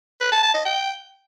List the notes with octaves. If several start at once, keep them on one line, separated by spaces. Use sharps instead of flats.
B4
A5
A5
D#5
G5